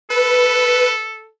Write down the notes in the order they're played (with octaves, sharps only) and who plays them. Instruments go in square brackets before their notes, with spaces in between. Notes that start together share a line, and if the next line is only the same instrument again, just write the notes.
[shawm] A4 [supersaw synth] B4